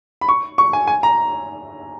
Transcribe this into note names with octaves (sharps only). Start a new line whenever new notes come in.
B5
C#6
C#6
G#5
G#5
A#5